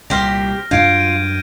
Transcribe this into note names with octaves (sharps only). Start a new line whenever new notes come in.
C2 A#2 G4 C5 F6 A#6
F#2 D4 F4 G6 G#6 D7
D#7